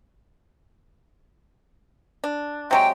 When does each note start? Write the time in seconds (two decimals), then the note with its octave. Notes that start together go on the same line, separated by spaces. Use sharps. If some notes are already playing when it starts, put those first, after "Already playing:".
2.24 D4
2.71 C3 F#3 G#3 G5